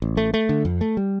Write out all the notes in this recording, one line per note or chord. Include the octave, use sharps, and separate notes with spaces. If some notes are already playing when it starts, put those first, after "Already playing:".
A1
A3
A3
D3
F2
A3
G3